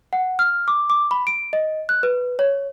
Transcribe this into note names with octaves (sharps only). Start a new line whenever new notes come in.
F#5
F6
D6
D6
B5
D7
D#5
F#6
B4
C#5